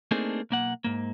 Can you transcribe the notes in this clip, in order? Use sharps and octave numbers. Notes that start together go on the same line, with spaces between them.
A3 A#3 C4 D4 D#4 G#4
B1 A#3 F#5
G#2 A#3